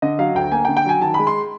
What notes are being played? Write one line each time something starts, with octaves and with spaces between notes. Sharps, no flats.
D3 D#5
F#3 F5
D2 G5
A#3 G#5
G5
D3
G5
F#3 G#5
D#3 A5
G#3 B5
C6